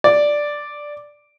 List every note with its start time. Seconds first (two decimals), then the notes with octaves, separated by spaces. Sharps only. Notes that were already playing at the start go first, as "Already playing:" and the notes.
0.04 D5